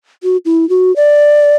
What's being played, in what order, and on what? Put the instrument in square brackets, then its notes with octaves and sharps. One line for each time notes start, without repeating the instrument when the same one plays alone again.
[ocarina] F#4
E4
F#4
D5